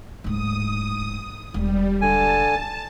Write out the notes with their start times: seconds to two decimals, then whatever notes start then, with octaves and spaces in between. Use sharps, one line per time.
0.24 D1 G#2 D#6
1.54 E1 G3
2.01 D3 G#5 A5